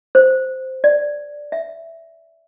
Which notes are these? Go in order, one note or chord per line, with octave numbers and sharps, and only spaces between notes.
C5
D5
E5